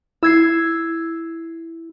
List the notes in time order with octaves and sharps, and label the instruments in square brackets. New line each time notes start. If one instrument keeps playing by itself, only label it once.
[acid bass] E4 [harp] E6 G#6 C7